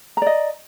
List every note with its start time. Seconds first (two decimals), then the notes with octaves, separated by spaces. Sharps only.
0.17 A#5
0.22 D5
0.27 D#5